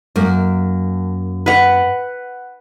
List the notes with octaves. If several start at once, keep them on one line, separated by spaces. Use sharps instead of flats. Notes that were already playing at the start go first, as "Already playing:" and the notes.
F#2 A#3
B4 F#5